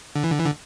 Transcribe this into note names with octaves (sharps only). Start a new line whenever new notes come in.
D3
E3
D3
E3
D3